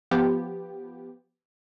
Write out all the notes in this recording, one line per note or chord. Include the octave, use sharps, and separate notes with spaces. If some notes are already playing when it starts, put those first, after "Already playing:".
F3 B3 G4